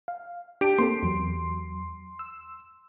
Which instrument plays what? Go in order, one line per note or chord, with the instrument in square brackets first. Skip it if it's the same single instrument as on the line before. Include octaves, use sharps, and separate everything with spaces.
[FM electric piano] F5
[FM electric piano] D4 A5 [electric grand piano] G4 D7
[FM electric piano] A#3 C4 A4 [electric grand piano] C6
[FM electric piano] E2 F#3
E6